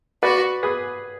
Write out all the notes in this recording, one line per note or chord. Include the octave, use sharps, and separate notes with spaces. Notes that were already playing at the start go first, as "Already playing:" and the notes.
F#4 B4 D5
G#4 B4